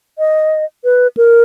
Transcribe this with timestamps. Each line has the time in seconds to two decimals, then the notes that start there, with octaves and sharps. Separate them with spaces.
0.19 D#5
0.84 B4
1.17 A#4